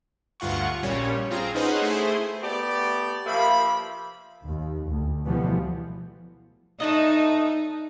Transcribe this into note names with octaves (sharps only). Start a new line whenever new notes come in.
D2 G2 F4 F#5 C#6
A#1 A#2 G3 C#4 C#5
C4 F4 G#4 A#5
C#4 D#4 G#4 B4 C5 F#5
A3 E4 G#4 C5
A3 B3 G4 D5
C3 F3 A#3 E5 B5
D#2
D2
B2 E3 F3 G3 A3 B3
A3 D4 D#4 D#5